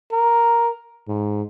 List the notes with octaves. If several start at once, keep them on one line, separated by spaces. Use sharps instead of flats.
A#4
G#2